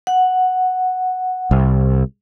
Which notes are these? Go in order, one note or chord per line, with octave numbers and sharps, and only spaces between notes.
F#5
C2